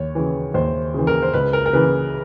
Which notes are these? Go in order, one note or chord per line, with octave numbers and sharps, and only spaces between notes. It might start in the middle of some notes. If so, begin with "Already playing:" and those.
Already playing: D#2 C#5
C#3 E3
D#2 C5
C#3 E3
A#4
C5
C#2 B4
A#4
A#4
C#3 E3 B4